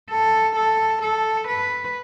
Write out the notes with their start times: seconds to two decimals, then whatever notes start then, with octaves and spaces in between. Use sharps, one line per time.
0.10 A4
0.56 A4
1.02 A4
1.48 B4